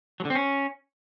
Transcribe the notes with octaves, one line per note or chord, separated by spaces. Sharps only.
F#3
D3
C4
C#4